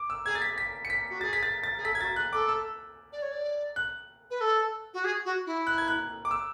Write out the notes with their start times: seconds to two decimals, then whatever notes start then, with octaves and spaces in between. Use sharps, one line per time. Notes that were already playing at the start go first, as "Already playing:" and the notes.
Already playing: D6
0.10 E6
0.26 G#4 G#6
0.35 A6
0.42 B6
0.58 B6
0.85 C#7
0.90 B6
1.10 F#4
1.21 G#4 A6
1.33 B6
1.43 A6
1.63 A6
1.77 G#4
1.85 A4 B6
1.95 G#6
2.01 F#4 A6
2.16 G#4 F#6
2.33 A4 D6
2.49 E6
3.12 D5
3.22 C#5
3.31 D5
3.76 F#6
4.30 B4
4.40 A4
4.93 F#4
5.04 G#4
5.25 F#4
5.46 E4
5.67 F#6
5.78 G#6
5.88 F#6
6.25 D6
6.31 E6